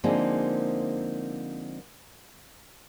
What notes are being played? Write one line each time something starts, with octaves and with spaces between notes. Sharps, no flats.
D3 F3 G#3 A#3 C4 D#4